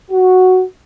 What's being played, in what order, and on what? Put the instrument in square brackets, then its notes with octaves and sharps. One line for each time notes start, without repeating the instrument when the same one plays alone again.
[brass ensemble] F#4